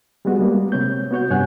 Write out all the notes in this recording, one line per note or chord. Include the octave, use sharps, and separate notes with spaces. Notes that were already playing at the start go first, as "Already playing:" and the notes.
G3 G#3 B3 F#4 G#4
G3 G#3 A#3 B3
C3 C4 C#5 G6
B3 F#4 C#5 G6
G2 C3 C#5 F#5 G#5 F#6